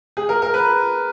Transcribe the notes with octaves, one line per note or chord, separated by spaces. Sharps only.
G#4
A#4
A#4
B4